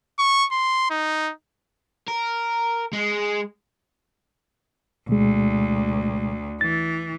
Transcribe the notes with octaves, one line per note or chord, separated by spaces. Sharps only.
C#6
C6
D#4
A#4
G#3
D2 B2 G#3
E3 A6